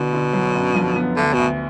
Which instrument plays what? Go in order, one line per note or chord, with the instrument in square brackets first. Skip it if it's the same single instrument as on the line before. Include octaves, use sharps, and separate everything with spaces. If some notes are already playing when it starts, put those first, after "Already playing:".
Already playing: [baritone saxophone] B2 [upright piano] D3
[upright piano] D3
F#3
F#2
F3
B3
[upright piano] D2 [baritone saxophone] D3
[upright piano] D2 [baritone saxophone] B2